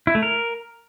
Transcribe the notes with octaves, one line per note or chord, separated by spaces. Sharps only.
E4
A3
A#4